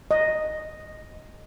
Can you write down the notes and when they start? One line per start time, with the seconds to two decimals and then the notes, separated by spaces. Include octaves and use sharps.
0.11 D#5